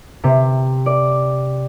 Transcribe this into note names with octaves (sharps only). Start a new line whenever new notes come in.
C3
D5